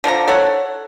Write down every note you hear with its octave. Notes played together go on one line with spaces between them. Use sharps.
D3 F3 A#4 A#5
A4 C#5 F#5